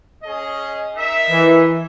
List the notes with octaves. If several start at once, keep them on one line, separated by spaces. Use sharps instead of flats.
C#4 G#4 D#5
D#4 A#4 E5
E3